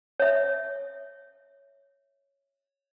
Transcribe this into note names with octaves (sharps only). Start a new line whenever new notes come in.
C#5 E5